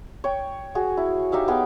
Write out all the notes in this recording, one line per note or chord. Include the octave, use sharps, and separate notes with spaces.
C#5 G5
F#4 G#4
E4
D#4 G4 E5 F5
B3 G#4 F5 G5